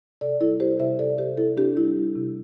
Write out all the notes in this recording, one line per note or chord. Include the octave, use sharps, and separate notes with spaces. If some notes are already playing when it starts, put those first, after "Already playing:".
C3 A4 D5
G3 E4 A4
C4 G4 C5
C3 C5 E5
C3 A4 D5
C3 G4 C5
C4 E4 A4
C4 D4 G4
G3 E4
G3
C3